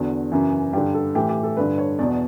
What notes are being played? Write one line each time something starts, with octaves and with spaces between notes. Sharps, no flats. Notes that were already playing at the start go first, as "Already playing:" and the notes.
Already playing: E2 D3 F#4
F#2 C#3 E3
G2 D3 G4
A4
A2 E3 G4
G4
A4
G2 D3 B4
C#5
E2 B2 D5